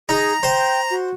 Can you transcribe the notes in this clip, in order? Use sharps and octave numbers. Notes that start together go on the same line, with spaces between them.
D#4 G#4 A#5
C5 G5
F#4